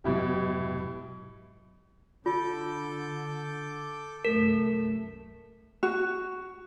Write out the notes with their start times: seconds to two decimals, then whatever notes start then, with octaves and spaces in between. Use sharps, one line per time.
0.04 F1 G#2 B2 F#3 E4 G4
2.26 D3 F4 A4 D6 G6
4.25 C2 F#2 A3 A#4
5.83 F#4